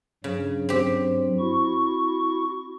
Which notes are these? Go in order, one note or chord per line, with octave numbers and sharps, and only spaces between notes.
G2 C#3 F#3
C4 G4
E4 F#4 C#6